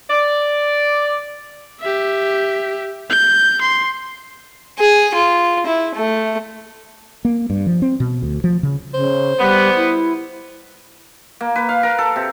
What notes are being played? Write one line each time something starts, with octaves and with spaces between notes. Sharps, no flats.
D5
G4 E5
G6
C6
G#4
F4
E4
A3
A#3
G2
F3
C4
B2
D2
F3
C#3
C#3 C5
G3 B3
E4
A#3
B4
F5
A#4
A4
C3